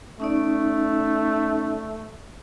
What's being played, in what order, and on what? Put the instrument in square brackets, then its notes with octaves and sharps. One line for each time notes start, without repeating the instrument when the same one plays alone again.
[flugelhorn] A3 [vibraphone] C#4 D#4 D5